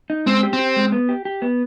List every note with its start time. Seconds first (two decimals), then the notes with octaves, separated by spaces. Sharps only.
0.10 D#4
0.26 G#3 C4
0.43 G4
0.53 C4
0.59 G4
0.76 G#3
0.92 B3
1.09 G4
1.25 G4
1.42 B3